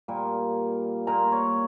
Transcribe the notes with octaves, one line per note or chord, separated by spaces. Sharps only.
A#2 G3 A#3
A#2 A#3 A#5
C#5